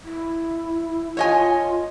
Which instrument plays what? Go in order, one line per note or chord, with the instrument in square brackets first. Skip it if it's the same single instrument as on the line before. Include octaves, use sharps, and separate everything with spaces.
[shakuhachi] E4
[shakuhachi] F4 [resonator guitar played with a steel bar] C#5 D#5 G#5